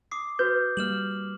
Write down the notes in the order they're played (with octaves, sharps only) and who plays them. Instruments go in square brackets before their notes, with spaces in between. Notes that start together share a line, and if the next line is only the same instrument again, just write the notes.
[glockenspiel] D6 D#6 C7
[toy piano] F#4 B4 [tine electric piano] G6
[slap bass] G3 G#3 A#3 [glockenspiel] F6 E7 F#7